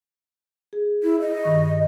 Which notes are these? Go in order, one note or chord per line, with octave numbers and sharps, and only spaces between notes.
G#4
E4
D#5
G2 D#3 C#6